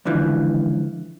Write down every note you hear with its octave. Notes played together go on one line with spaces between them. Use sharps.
C#2 D3 E3 F3